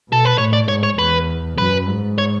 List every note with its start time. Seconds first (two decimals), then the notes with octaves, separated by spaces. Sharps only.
0.09 B2 A4
0.25 B4
0.38 A2 C#5
0.53 D5
0.68 G#2 C#5
0.83 C#5
0.98 E2 B4
1.58 F#2 B4
1.88 G#2
2.18 C#5